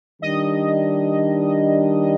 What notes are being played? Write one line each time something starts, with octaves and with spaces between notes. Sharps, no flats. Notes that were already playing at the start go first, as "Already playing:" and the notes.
D#3 G3 D4 D#5